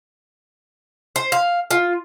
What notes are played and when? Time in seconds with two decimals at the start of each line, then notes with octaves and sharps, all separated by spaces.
1.16 C5
1.32 F5
1.71 F4